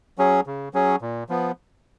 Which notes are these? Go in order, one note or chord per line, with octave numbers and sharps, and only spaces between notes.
F#3 C#4 G#4
C#3
F#3 C#4 G#4
A#2
F3 B3